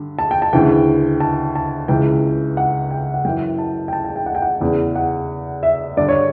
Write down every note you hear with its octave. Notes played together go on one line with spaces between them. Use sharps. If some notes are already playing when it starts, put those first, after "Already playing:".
Already playing: G2 D3
A5
G5
A5
D2 C#3 E3 G5
A5
A5
C#2 C#3 E3 G5
F#5
G5
F#5
F#2 E3 G5
A5
G5
A5
G5
A5
G5
F#5
G5
F#5
E2 C#3 E3
F#5
E5
G2 D3 D5
C#5